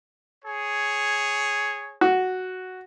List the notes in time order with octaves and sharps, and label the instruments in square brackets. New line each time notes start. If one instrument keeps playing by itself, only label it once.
[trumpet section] G#4 C#5
[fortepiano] F#4